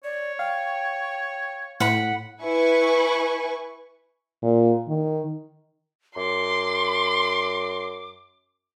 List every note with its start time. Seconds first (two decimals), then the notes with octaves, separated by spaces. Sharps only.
0.04 C#5 D5
0.39 F5 G5
1.80 A2 F#5 B5
2.42 E4 B4 G#5 C#6
4.43 A#2
4.88 D#3
6.17 F#2 C6 D6